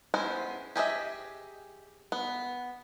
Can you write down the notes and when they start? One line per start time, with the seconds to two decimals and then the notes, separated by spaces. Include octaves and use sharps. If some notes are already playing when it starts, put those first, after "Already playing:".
0.14 G#3 B3 C#4 E4 C5
0.76 G4 G#4 D#5 E5
2.12 B3